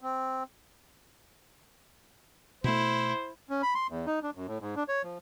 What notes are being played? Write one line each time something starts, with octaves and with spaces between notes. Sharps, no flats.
C4
B2 A3 E4 C5
C#4
B5
C6
E2
D#4
D4
F#2
A2
G#2
D4
C#5
F3